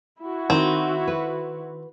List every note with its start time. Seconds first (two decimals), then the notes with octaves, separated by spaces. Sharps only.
0.20 E4 F#4
0.50 D#3 C4 D#4
1.07 B4